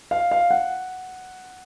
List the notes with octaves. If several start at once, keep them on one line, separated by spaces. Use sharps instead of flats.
F5
F5
F#5